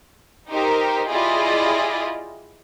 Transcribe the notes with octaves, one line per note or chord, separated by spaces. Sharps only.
D#4 G4 A#4 C5
E4 F4 G4 G#4 D5 D#5